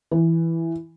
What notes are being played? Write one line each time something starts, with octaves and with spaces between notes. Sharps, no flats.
E3